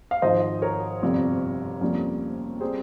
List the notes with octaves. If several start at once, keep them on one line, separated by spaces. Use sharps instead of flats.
F5
G#1 G#2 F3 C5 D#5
A#4 C#5
G1 F2 C3 G3
F2 C3 G3 A#3 C#4
G3 C4 G#4 C5